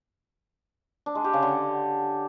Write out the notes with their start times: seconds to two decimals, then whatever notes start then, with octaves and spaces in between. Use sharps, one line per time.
1.06 D4
1.15 G#3
1.24 G4
1.33 C#3
1.42 D3